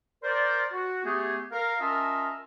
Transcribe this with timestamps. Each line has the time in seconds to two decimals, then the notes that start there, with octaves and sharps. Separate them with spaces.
0.23 A#4 C5 D5
0.73 F#4
1.05 A3 B3 G4 G#4
1.52 A#4 F5
1.81 C#4 F4 A#4 D#5 E5 A5